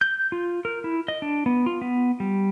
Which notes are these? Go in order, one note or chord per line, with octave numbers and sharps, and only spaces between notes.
G6
F4
A#4
E4
D#5
D4
B3
F4
B3
G3